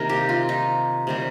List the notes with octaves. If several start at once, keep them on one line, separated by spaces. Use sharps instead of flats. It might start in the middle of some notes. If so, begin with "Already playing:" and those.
Already playing: C3 D#3 A#3 A#4
G4
F4
D#4
C3 D#3 G3